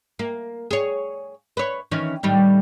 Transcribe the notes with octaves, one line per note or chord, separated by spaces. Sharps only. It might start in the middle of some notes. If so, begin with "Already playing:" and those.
A#3
G#4 C#5
B4 C#5
D#3 E3 C#4
A2 D#3 G3